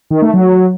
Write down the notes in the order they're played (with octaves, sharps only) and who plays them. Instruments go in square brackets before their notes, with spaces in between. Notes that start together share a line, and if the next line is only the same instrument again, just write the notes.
[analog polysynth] D#3
A3
F#3